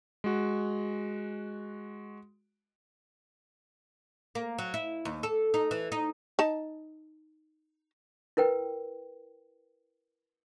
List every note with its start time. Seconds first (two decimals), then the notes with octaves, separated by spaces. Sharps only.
0.24 G#3 F#4
4.35 A#3
4.59 F#3
4.74 E4
5.05 D#2
5.23 A4
5.54 D#4
5.71 E3
5.92 D#4
6.39 D#4 A5
8.37 E4 A#4 B4 G5